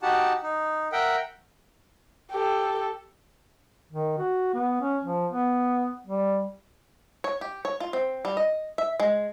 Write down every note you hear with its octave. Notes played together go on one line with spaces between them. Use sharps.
D#4 F#4 G4 F#5 A5
D#4
A#4 E5 F#5 G5
G4 A4
D#3
F#4
B3
C#4
F3
B3
G3
C#5
G4
C#5
F4
C4
G3
D#5
E5
G#3